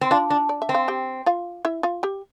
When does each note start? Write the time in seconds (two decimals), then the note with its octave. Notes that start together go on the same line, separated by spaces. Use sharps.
0.01 C4
0.11 D4 F4 F5
0.30 D4
0.49 D5
0.62 E5
0.69 C4
0.74 F5
0.88 G4 G5
1.26 F4 F5
1.65 E4 E5
1.83 F4 F5
2.03 G4 G5